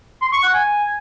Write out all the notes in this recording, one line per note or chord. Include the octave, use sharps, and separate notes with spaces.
C6
C#6
F#5
G#5